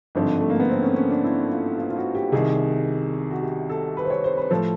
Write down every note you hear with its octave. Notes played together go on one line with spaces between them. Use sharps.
G#1 G2 D3 F3
A3
A#3
B3
C4
C#4
C#4
D4
E4
F4
F4
F4
F#4
G4
C2 C3 D#3 G#4
F#4
G4
A4
B4
C5
C#5
C5
B4
A2 F3 A4